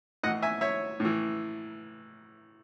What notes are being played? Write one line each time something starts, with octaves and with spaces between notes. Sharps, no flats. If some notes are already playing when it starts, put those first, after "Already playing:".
A2 E3 D#5 F#5
E5 G#5
C#5 E5
A2
E3